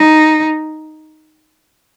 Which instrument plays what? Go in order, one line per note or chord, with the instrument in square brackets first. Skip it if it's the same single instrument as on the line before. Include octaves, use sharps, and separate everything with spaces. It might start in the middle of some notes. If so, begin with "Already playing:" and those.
Already playing: [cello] D#4